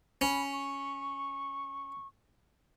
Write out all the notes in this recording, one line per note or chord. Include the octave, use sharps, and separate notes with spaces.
C#4 B5
C#6